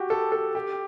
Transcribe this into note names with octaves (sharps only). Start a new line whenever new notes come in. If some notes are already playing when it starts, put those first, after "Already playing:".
Already playing: F#4 G4
A4
A4
G4